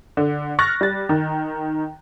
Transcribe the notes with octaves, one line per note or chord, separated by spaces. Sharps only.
D3
C#6 F6 F#6 A6 A#6
G3 A6
D#3